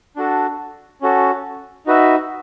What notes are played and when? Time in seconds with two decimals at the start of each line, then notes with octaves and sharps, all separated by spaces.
0.16 D4 F#4 A4
1.01 C#4 F#4 A4
1.86 D#4 F#4 B4 E5